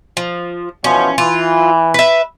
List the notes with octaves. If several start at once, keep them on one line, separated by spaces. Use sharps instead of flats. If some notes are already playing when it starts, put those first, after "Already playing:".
F3
B2 E3 F3 C#4
E3 F4
B4 E5